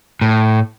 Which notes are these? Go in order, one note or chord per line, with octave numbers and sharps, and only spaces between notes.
A2